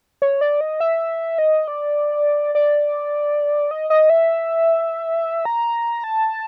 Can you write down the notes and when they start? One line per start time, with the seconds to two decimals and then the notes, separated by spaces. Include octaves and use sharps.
0.22 C#5
0.41 D5
0.61 D#5
0.80 E5
1.38 D#5
1.68 D5
2.55 D5
3.71 D#5
3.90 D#5
4.10 E5
5.45 A#5
6.04 A5